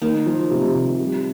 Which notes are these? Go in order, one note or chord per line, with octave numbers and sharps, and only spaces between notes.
D#3 A#3
F3
C3
C3
G3